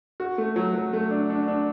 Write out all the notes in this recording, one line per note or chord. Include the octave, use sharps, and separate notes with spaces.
F#4
A3
F#3
F#3
A3
D4
D4
D4